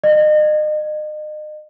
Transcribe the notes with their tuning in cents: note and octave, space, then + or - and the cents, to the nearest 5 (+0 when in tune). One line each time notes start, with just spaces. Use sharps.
D#5 -35